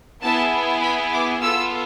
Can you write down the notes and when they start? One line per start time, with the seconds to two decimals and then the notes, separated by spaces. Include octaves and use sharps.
0.21 B3 E4 G#4 A5
0.82 B5
1.12 D6
1.41 B3 F4 A4 E6